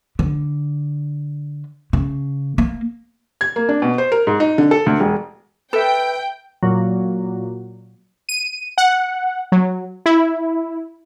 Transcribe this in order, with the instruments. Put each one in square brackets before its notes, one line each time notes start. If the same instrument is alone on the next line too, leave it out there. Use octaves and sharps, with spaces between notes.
[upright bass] D3
C#3
A#3
[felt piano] G#6
A#3
D4
B2
C5
A#4
G#2
D#4
D3
A4
D2
E1
[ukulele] A4 [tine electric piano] B4 E5 [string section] G5
[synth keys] A#2 F#3
[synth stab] D#7
F#5
F#3
E4